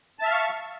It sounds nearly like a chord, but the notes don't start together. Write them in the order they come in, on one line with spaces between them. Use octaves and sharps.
A5 E5 F6 F5 C#6